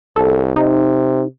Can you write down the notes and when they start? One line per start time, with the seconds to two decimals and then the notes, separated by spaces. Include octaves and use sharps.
0.16 C2 A4
0.56 C3 D#4